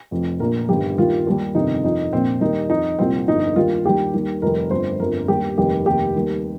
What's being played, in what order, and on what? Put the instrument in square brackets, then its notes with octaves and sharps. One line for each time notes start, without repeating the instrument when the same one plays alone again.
[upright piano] F1 F2 F3
A#1 A#2 F3 A#4
G1 G2 D#3 G3 G4
D#2 D#3 G3 F4
D#2 D#3 G3
G1 F2 C3 D#3 D#4
F2 F3 D#4
A#1 A#2 F3 C4
D#2 D#3 G3 D#4
F2 F3 D#4
C2 A#2 F3 C4
G1 F2 F3 D#4
D#2 D#3 G3 F4
D#2 D#3 G3 G4
D#2 D#3 G3
F1 F2 D#3 G3 A#4
G1 F2 F3 C5
G1 F2 F3 A#4
D#2 D#3 G3 G4
F1 D#2 D#3 G3 G4
F1 D#2 D#3 G4
D#2 D#3 G3